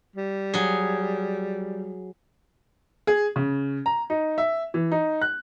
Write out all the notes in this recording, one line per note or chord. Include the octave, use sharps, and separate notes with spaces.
G3
F#3 G#4
G#4
C#3
A#5
D#4
E5
E3
D#4
F#6